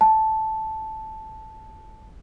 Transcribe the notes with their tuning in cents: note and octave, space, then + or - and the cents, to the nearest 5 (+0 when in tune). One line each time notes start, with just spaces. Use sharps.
A5 -5